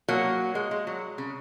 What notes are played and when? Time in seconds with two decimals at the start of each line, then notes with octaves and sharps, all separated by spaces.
0.08 F#3 A#3
0.55 G#3
0.71 G#3
0.87 F#3
1.18 C#3